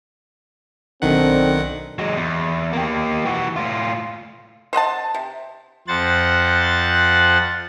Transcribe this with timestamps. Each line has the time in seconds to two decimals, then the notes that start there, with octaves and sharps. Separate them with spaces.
1.02 B1 D#3 C4 D4 A4 F#5
1.99 F#3 G#3
2.17 E2
2.73 A#3 G4
3.25 E3 F#4
3.56 A2 F4
4.73 C5 D#5 F#5 A5
5.14 C3
5.88 F2 C5 F#5 A6